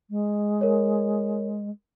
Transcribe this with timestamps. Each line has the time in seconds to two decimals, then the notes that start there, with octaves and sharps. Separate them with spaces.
0.10 G#3
0.61 A#4 C#5